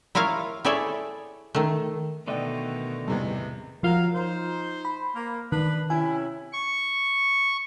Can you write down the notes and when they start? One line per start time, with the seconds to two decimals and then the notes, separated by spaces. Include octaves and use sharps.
0.15 E4 F4 A#4 C#5 F5
0.65 E4 G#4 A4 C#5 D5 E5
1.55 D#3 A3
2.28 B2 D3 D#3 A3 B3 D5 D#5 G5
3.08 A1 E2 C3 G3
3.83 F3 F#3 F4 A#4 F5
4.15 D#4 C5
4.85 B5
5.16 A#3
5.52 D#3 D4 B4
5.90 C3 C#4 E4 G#5
6.53 C#6